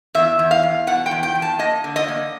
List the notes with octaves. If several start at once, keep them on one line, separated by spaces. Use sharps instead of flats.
E2 E5
E2
F5
E2
B2 F#5
G5
E2
G5
E2
A5
A#3 D#5
D3
D#5
A#3